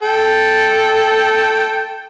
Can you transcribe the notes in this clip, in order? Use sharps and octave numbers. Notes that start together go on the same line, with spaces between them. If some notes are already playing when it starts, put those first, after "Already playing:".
A4 G5